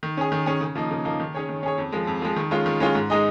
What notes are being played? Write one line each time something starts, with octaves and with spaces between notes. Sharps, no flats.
D#3
C#4 G#4
D#3
C#4 G#4
C#3
F3 A#3 D#4
C#3
F3 A#3 D#4
D#3
C#4 G#4 C#5
D#3
C#4 G#4 C#5
F2
F3 G#3
F2
F3 G#3
D#3
G#3 C#4 F4
D#3
G#3 C#4 F4
G#2
G#3 D#4 G#4 D#5